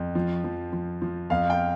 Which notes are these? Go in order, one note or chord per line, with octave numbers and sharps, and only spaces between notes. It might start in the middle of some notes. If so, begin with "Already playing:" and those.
Already playing: F2
F3
F3
F3
F3
F2 F5
G5